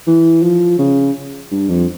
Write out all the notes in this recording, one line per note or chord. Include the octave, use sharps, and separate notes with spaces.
E3
F3
C#3
G2
F2